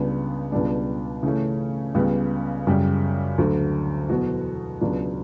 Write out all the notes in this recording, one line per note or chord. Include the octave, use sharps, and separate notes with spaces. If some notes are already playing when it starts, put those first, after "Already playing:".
Already playing: C#2 C#3 G3 B3 D4
C#2 B2 G3 D4
C#3 E3 A3 C#4
C#2 C#3 G3 B3
F#2 C#3 G3
D2 D3 F#3
E2 B2 F#3 B3 F#4
C#2 B2 F#3 B3 D4